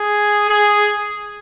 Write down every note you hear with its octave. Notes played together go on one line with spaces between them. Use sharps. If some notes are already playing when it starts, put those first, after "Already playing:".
Already playing: G#4
G#4